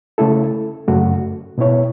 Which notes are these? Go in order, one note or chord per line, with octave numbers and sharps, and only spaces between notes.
C#3 A3 E4 A4
F#2 C#3 A3 F#4
B2 B3 E4 C#5